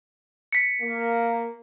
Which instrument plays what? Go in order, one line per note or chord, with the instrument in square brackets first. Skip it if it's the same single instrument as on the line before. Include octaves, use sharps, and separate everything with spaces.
[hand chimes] B6 C#7
[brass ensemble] A#3